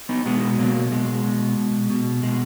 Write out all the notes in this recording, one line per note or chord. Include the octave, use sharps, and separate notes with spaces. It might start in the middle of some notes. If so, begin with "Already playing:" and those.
B3 D#4
B2 G#3 B3
B2 F#3 A#3
B2 G#3
B2
B2
B2
B2 G#3